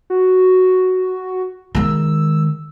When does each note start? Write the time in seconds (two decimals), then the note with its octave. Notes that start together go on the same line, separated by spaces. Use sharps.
0.10 F#4
1.75 D#3 G#3 E6